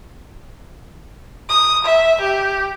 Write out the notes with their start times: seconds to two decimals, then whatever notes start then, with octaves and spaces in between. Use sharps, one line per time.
1.49 D#6
1.84 E5
2.21 G4